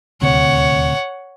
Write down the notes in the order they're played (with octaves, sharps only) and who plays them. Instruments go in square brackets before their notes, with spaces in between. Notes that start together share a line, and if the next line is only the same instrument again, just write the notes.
[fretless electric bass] D#1 D2 C3 [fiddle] C#5 F#5